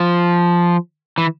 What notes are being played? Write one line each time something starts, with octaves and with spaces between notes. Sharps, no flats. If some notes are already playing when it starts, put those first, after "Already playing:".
Already playing: F3
E3